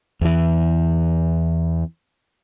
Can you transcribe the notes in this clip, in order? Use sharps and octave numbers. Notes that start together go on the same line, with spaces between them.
E2 E3